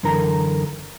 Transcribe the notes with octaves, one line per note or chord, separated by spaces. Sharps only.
F#2 D3 E3 A#4 A#5